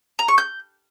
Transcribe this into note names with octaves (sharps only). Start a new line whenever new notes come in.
A#5
C#6
G6